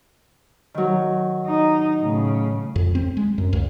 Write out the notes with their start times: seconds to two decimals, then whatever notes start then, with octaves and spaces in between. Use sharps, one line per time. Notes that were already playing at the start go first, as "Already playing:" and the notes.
0.74 D#3 F#3
1.47 D#4
2.01 A2 C#3
2.76 F2
2.95 C4
3.17 G#3
3.38 F#2
3.53 C#2